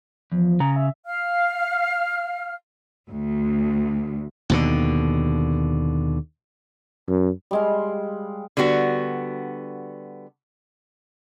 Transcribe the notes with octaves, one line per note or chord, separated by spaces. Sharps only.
E2 F3
C#3 A#5
E5
F5 F6
D2
D#2 B2 D3
F#2
G3 G#3 F5
D3 G3 B3 F#4